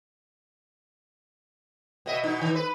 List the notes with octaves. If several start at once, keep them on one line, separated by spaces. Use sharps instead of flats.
B2 D#5 E5
B2 D#4
D#3
B4